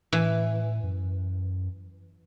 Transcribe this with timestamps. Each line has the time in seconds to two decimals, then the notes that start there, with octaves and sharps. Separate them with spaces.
0.13 A2 E3
0.83 F#2